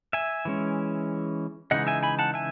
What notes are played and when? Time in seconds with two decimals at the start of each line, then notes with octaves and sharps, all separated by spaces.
0.13 E5 G#5
0.45 E3 G#3 C#4
1.71 C#3 E3 G#3 D#4 D#5 F#5
1.87 E5 G#5
2.03 G#5 B5
2.19 F#5 A5
2.34 E5 G#5